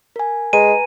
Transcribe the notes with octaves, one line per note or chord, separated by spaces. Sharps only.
A#4 G#5
G#3 B4 G#5 A#5 D#7